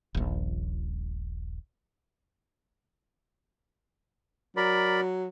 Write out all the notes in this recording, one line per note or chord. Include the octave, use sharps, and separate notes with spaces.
D#1 A#1
F#3 A#4 D5 B5